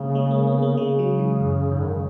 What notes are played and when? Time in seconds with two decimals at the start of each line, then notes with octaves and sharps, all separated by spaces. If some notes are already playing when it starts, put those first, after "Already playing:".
Already playing: C#3 G#3 A#3
0.15 G#3
0.31 A#3
0.47 B3
0.62 A#3
0.77 C#3 G#3
0.99 F#3
1.19 E3
1.40 F#2
1.72 G#2
1.84 D#3
1.93 C#3